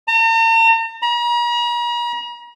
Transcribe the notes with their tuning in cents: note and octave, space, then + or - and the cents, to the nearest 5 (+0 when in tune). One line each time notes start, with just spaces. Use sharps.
A#5 -45
A#5 +45